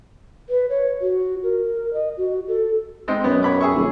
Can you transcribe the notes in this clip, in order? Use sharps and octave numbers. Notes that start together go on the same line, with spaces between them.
B4
C#5
F#4
A#4
D#5
F#4
A4
G#3 C4 D#4
F#2 B3
C#5 B5 D6
G#4 E5 C#6
D#1